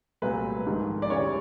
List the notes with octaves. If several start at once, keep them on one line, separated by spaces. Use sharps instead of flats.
C2 A#2 F#3 A3 B4
A#1 G#2 D#3
D5
D2 C#3 E3 G3 C#5